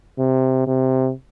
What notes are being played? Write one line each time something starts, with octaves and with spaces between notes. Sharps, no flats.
C3
C3